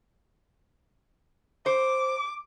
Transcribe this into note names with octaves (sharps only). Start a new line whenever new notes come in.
C5 D6